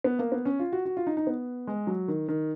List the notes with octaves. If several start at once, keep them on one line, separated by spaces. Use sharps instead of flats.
B3
A#3
B3
C#4
F4
F#4
F#4
F4
D#4
D#4
B3
G#3
F#3
D#3
D#3